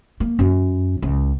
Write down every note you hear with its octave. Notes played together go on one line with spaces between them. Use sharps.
A#3
F#2
C#2